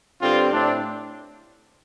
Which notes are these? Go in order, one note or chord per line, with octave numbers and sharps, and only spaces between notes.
G2 D3 G3 C4 F4
A2 A3 C4 D4